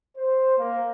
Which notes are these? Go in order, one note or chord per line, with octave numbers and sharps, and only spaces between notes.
C5
A#3